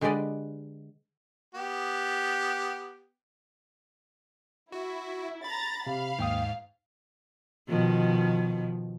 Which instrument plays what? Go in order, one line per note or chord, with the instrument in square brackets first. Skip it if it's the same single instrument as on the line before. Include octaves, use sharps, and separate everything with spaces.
[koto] D3 G#3 G4 B4 D5 D#5
[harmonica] B3 G4
[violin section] E4 [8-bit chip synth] F#4
[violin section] A#5 A6 [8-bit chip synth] B5
[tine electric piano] C3 [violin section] F5
[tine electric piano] D#2 G5 D#6 [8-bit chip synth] G#2
[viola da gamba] B2 D#3 F3